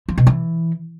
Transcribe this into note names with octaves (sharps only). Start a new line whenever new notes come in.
F3
B2
E3